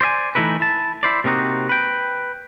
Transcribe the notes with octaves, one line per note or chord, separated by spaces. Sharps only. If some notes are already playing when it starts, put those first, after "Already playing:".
C5 D5 E5 G#5
E3 A3 D#4 E4 B4
E4 A5
E4 C5 D5
C3 A#3 C4 D#4 F#4
B4 G5